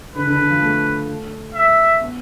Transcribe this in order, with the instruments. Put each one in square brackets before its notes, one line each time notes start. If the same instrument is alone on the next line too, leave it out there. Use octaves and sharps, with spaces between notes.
[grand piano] D3 [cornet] B4
[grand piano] D3
D3
F3
A3
[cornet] E5
[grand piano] B3